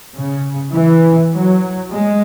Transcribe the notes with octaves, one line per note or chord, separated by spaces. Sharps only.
C#3
E3
F#3
G#3